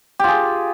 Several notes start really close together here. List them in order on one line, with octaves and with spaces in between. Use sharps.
G4 F4 G#4